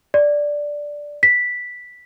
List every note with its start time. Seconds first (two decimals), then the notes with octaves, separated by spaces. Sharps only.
0.14 D5
1.23 B6